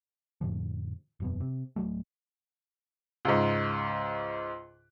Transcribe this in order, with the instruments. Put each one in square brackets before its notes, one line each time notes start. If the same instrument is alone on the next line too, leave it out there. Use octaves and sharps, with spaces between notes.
[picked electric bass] F2 A2 D3 F3
E1 F#2 B2
C3
D1 G1 F#3 A3
[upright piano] C#2 G#2